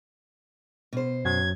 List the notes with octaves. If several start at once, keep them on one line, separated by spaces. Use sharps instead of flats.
B2 C5
F#2 F#3 G#6